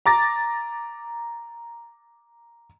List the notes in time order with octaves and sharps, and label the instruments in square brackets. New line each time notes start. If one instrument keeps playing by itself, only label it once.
[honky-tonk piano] A#5 D6 A6 A#6